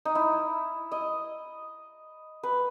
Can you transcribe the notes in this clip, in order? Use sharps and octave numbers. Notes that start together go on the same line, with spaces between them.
D#4
E4
D#5
B4